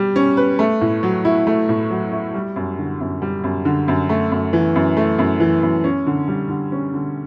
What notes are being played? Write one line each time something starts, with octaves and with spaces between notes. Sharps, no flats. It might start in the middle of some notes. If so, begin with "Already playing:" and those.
Already playing: G3 G4
C#4
B4
A3
A2
F#3
E4
A3
A2
F#3
E4
G3
F#2
D3
F#2
G3
F#2
D3
F#2
A3
F#2
E3
F#2
A3
F#2
E3
F#2
C#4
D3
G3
D3
C#4
D3